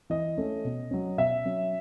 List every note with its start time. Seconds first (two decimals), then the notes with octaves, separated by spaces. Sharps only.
0.10 E3 D#5
0.38 A3 C#4
0.65 B2
0.91 F#3 C#4
1.18 B2 E5
1.45 F#3 C#4